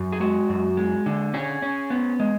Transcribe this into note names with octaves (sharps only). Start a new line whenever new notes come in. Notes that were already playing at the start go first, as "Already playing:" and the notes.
Already playing: F#2
G#4
G#3 F#4
F#2
G#3
D3
C#4 G#4
C#4
B3
G#3